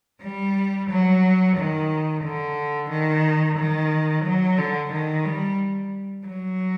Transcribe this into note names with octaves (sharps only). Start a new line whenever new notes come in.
G3
F#3
D#3
D3
D#3
D#3
F#3
D3
D#3
G3
F#3